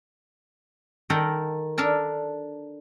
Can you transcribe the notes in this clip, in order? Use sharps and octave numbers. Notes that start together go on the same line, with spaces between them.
D#3 A4 A#4 F#5 G5
D4 A4 A#4 A5